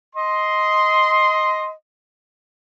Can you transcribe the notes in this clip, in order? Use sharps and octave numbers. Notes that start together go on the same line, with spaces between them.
D#5 C6